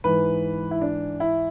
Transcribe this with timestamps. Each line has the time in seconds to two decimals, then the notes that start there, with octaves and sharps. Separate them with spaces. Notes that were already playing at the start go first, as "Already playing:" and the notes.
0.04 G#2 E3 B4
0.71 E4
0.81 D4
1.20 E4